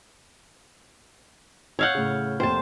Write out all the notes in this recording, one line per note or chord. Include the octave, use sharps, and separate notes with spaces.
C#5 F5 F#5 E6 G6
A2 C#3
F1 A#3 C5 G5 A5